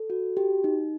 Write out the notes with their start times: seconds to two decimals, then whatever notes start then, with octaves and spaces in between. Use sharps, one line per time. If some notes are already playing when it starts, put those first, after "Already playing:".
Already playing: A4
0.10 F#4
0.37 G4
0.64 D#4